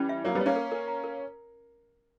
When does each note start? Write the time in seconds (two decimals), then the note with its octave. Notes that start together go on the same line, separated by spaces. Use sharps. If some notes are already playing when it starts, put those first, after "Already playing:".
Already playing: E3 G3 C#4
0.09 E5
0.24 F#3 A#3 C#5
0.35 G3 B3
0.41 C#5
0.46 A#3 C#4
0.56 A#4
0.72 A#4
0.88 A#5
1.04 A#4